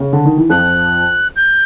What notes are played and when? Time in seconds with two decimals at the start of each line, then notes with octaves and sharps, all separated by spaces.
0.00 C#3
0.13 D3
0.25 D#3
0.38 E3
0.50 F2 F3 F#6
1.36 G6